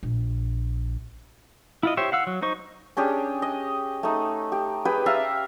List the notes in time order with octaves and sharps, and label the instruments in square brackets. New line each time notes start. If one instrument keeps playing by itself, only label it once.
[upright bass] A#1
[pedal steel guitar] E4 F4 D#5
G4 C5 C#5 E5
F5 F#5 E6
F#3
D#4 C5 C#6
[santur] C#4 D4 G4 G#4
D#5
A3 D#4
G4
G4 G#4 B4 G5
E5 F5 A5 A#5